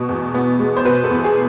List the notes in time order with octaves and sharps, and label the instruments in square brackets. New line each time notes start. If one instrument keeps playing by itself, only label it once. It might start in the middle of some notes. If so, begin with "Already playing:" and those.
Already playing: [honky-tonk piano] B2 B3
E2
B3
G#3
C5
B2 B4
A4
E2
G#4